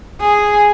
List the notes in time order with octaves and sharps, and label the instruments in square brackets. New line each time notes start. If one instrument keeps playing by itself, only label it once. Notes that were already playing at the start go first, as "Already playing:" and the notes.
[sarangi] G#4